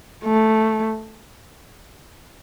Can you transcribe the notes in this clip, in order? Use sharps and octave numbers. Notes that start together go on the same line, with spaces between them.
A3